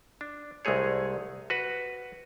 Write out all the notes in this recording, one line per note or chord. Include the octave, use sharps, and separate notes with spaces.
D4
C2 G#3 A3 G#4 C#5
F#4 B4